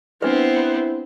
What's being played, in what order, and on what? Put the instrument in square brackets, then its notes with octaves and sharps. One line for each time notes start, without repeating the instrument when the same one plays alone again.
[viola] B3 C5 [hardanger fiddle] C4 [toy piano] D4 B4 [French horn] E4